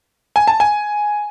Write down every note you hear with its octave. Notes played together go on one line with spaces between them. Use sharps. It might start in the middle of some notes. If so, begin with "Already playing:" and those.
G#5
A5
G#5